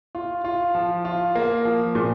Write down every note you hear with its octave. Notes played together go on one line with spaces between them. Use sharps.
F4
F4
F3
F4
A#3
F3
A#2